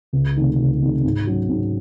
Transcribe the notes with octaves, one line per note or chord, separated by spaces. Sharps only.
C#2
C3 D#3 A3 D#4
C#2
C3 D#3 A3 D#4
G#2
F#3 C#4
G#2